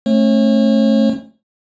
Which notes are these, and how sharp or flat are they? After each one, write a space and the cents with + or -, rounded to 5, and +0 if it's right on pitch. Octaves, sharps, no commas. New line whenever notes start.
A3 +0 C#4 -40 C#5 -40